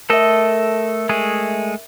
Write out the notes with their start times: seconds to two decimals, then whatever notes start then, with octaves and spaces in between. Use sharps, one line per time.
0.10 A3 A4 A#4 D#5 E5
1.09 G#3 A3 G#4